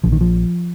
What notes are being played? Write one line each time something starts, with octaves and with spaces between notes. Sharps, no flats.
A#1 A#2 F3
D#3
F3